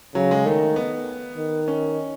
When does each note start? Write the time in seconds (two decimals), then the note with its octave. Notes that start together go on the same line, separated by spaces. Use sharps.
0.15 C#3 F#3
0.31 G#3
0.46 D#3 A3
0.76 B3
1.37 D#3
1.68 C#4